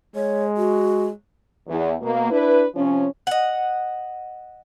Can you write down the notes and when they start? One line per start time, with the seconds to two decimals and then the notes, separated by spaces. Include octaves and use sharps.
0.15 G#3 C#5
0.57 F#4
1.68 E2
2.02 B2 A#3
2.30 D4 E4 B4
2.75 C3 F3 C#4
3.27 D#5 F#5